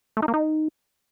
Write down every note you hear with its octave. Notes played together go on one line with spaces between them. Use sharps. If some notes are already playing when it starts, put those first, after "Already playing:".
A3
D#4
A#3
D#4